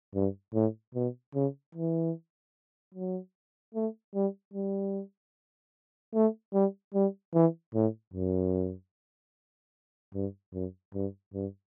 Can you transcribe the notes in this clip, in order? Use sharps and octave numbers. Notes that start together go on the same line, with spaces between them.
G2
A2
B2
C#3
E3
F#3
A3
G3
G3
A3
G3
G3
E3
A2
F#2
G2
F#2
G2
G2